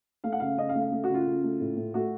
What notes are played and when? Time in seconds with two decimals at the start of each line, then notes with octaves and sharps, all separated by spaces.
0.24 A3 F5
0.32 F#5
0.40 C#3 F5
0.57 C#3 D#5
0.69 F5
0.75 A3
0.81 F5
0.92 A3
1.04 F#4
1.09 C#3
1.14 F4
1.26 C#3
1.44 A3
1.60 A2
1.77 A2
1.94 A3 F#4